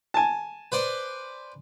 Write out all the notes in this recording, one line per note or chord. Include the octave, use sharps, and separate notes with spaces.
G#5 A5
B4 C5 D5